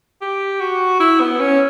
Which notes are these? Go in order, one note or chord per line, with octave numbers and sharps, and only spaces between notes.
G4
F#4
E4
B3
C#4